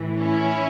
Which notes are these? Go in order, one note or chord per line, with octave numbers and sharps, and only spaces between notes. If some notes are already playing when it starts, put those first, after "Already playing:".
Already playing: A2 E3
C#4 E4